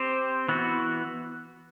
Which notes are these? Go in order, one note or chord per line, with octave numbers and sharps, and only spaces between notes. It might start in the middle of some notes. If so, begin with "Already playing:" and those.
Already playing: C4 G4 C5
E3 B3 F#4